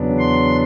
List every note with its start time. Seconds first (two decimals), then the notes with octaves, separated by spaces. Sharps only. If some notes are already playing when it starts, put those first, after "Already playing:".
Already playing: E2 C#3 F#3 B3 D4
0.19 C6